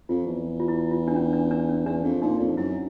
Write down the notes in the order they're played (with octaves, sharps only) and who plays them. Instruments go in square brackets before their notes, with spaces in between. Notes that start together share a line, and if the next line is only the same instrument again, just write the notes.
[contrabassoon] F2 [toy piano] F4
[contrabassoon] E2
[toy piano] F4
E4
F4
D4
C#4
D4
D4
C#4
[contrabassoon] E2 [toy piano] D4
[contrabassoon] F2
[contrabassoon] A#2 [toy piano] D#4
[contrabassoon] F2
[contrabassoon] F#2 [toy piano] E4